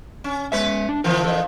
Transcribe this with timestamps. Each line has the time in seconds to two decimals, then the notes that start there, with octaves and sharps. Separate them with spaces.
0.24 C#4
0.52 G#3 C#4 B4 E5
0.89 D4
1.04 D3 E3 F3 F4 A#4
1.24 A4 A#4 D#5